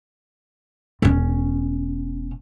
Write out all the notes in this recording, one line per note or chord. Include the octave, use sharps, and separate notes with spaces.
E1 C#4